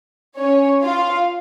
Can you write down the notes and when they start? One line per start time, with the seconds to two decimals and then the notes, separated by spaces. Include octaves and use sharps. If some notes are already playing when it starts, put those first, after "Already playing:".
0.38 C#4 C#5
0.82 F4 F5